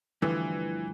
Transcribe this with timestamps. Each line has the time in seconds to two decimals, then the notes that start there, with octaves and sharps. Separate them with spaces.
0.22 G2 D3 E3 F3 A3